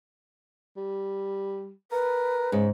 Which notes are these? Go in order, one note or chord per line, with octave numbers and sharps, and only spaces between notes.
G3
A#4 B4
G#2 C#3